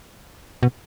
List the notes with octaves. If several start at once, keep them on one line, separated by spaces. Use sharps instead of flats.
B2